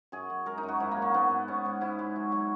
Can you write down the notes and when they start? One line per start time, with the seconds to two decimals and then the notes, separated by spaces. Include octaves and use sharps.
0.12 F#2 G#4
0.30 F#2
0.46 G#3 A#4
0.58 D#4
0.63 F#2
0.68 F#4
0.80 G#2 E4
0.91 A#3
0.97 F#3
1.02 A#3
1.14 G#2 B3
1.31 G#2
1.48 G#2 C#4
1.65 G#2
1.81 G#2 E4
1.99 G#3
2.16 F#3
2.32 F#3